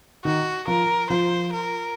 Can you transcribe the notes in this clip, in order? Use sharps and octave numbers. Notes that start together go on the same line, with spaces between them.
D#3 D#4 F#4
F3 F4 A#4
F3 F4 C5
A#4